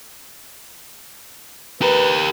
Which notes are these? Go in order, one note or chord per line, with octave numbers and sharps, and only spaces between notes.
G4 A#4 B4